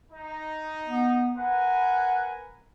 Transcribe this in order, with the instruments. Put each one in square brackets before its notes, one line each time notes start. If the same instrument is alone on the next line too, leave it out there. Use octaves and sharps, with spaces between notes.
[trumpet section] D#4
[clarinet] B3
[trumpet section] A#4 B4 G#5 [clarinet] F#5